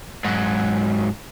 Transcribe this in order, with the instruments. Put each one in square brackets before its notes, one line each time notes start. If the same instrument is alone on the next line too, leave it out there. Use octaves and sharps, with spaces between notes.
[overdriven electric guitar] G#2 F#3